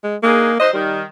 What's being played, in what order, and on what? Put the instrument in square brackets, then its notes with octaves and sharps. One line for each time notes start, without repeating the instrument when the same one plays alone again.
[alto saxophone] G#3
[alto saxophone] A#3 [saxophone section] D4 D#4 G#4
[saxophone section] F#3 D#4 C5 [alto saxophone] D#5
[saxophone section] D#3 [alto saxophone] G3